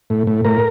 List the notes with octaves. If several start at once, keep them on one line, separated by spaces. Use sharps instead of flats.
A2
A2
A2 A#4